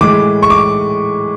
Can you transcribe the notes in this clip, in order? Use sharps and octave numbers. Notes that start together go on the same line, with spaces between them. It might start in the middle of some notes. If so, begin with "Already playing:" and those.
A2 E3 G#3 D6
C#6
D6